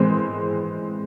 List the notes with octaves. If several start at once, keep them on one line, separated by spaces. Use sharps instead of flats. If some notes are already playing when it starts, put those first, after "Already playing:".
Already playing: E3 G#3 C4